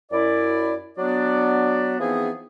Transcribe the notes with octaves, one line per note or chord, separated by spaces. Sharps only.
F#2 E4 D5
F#3 B3 D4 D5
E3 F3 B3 C4 D#4 G#4